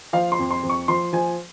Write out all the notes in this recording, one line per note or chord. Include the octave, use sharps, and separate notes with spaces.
F3 F5
C6
F2
C6
F2
C#6
F3 C6
F3 G#5